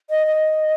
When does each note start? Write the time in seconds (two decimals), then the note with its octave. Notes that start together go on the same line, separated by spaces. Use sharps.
0.10 D#5
0.27 D#5